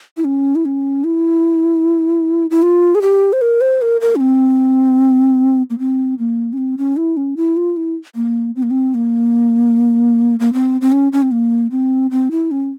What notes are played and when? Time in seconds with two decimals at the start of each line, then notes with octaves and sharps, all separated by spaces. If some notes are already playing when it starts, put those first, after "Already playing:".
0.17 E4
0.25 C#4
0.55 E4
0.65 C#4
1.04 E4
2.51 E4
2.62 F4
2.95 G#4
3.02 G4
3.33 C5
3.41 A#4
3.61 C5
3.82 A#4
4.01 A#4
4.16 C#4
4.20 C4
5.70 A#3
5.79 C4
6.19 A#3
6.53 C#4
6.58 C4
6.78 C#4
6.97 E4
7.17 C#4
7.37 E4
7.57 F4
7.77 E4
8.15 A#3
8.56 C4
8.63 A#3
8.70 C4
8.94 A#3
10.40 A#3
10.53 C4
10.81 C4
10.92 C#4
11.13 C#4
11.22 C4
11.31 A#3
11.71 C4
12.11 C4
12.31 E4
12.51 C#4